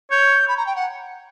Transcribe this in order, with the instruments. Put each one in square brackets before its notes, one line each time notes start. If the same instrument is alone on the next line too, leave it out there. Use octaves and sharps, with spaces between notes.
[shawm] C#5 [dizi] G6
[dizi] B5
A#5
G5
F#5